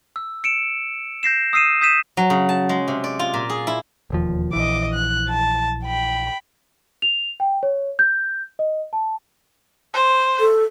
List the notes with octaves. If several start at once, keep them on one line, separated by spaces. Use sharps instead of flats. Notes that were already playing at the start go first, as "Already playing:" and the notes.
E6
C#7 D7 E7
G6 A#6 C7 E7
D#6 E6 C7 D#7 E7
D#6 G6 B6 D#7 E7
F#3
C#3
A5
G#3
C3
D5
F4
A#2
G#4
E4
E1 D#2 F3
A#1 E3 D#5 D6
F#6
A5
G5 B5
F7
G5
C#5
G6
D#5
A5
C5
A4